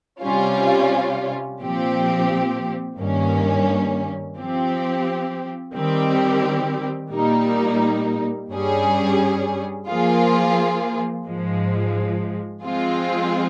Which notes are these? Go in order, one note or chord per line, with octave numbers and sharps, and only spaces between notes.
C3 G3 C#4 F4
A#2 F3 C4 G4
G2 D#3 A#3 C#4
F3 C4 G4
D#3 G3 C4 G4
A#2 G3 A#3 D#4
G2 G3 C#4 G#4
F3 A#3 F4 G#4
G#2 F3 G#3
F3 G#3 C4 F4 G#4